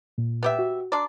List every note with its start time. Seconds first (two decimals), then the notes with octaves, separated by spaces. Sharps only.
0.18 A#2
0.43 B3 G4 E5
0.59 F#4
0.92 D4 D5 A#5 C6